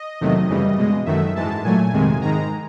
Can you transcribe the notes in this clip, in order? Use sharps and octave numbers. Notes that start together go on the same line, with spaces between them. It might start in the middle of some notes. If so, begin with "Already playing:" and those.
Already playing: D#5
E2 C3 D#3 F#3 A3
F#2 C#3 E3 G3
B2 G#3
F#2 D#3 F#3 A3 E5
G#2 E3 G#3 A5
A#2 F#3 A3 G#5
F2 C3 D#3 G#3
G#2 D#3 G#3 A#5